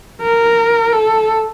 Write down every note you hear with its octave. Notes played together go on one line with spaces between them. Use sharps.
A#4
A4